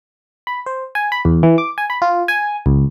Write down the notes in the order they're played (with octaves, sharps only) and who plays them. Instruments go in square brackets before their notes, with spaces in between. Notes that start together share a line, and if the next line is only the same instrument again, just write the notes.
[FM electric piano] B5
C5
G#5
B5
E2
E3
D6
G#5
B5
F4
G#5
C#2